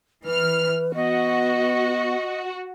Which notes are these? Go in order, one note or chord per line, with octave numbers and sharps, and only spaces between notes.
E3 B4 F6
B3 F#4 D#5